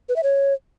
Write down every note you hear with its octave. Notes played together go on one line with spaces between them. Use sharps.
B4
E5
C#5